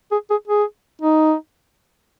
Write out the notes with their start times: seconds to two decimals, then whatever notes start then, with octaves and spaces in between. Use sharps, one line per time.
0.12 G#4
0.30 G#4
0.48 G#4
1.01 D#4